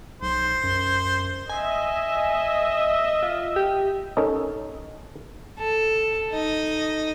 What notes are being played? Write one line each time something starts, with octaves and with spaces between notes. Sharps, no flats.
B1 C5
F#2
D#5 E5 G#5
F4
G4
C#4 D#4 A4 A#4 D#5
A4
D#4 D#5